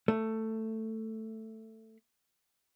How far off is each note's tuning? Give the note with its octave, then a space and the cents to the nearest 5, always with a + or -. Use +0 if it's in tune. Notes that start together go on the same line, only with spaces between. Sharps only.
A3 +10